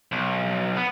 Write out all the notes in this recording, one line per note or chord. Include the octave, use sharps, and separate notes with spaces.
B1
B3